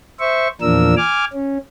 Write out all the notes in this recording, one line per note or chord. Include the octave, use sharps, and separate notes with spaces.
C5 E5 C#6
E2 A#2 F3 D4 A#4 E6
G#5 D6 F6
C#4